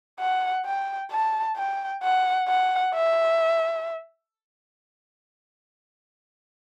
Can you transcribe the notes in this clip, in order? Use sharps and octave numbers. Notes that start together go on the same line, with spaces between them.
F#5
G5
A5
G5
F#5
F#5
E5